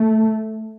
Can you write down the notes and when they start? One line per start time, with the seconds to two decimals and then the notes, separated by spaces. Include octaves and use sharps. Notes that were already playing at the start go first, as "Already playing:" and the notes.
Already playing: A3